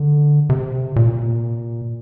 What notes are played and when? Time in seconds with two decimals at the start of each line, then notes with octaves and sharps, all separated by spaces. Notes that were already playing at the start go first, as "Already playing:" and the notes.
Already playing: D3
0.50 C3
0.96 A#2